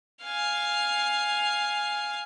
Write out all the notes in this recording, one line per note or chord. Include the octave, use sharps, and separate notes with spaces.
F5 G#5